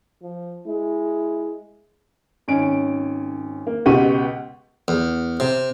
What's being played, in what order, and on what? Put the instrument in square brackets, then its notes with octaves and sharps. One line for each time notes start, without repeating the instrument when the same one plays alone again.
[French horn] F3
[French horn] G#3 [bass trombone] E4
[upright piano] G#1 C#4 D7
A#3
C#2 B2 G4 F#5 C#6 D#7
[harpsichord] E2
C3